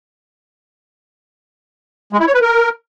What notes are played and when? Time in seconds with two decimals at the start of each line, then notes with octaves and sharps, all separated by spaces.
2.13 G#3
2.20 E4
2.27 C#5
2.34 B4
2.41 A#4